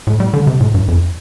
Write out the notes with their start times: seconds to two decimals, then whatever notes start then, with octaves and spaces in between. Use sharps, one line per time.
0.07 A2
0.20 G3
0.33 D3
0.47 C3
0.60 A2
0.74 G2
0.88 F2